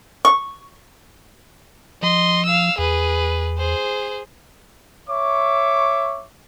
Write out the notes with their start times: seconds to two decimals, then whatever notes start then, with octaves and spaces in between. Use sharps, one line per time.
0.25 C#6
2.02 F3 D#5 C6
2.46 F5 E6
2.79 E2 G#4 B4
3.58 G#4 C5
5.08 C#5 E5 C#6 D6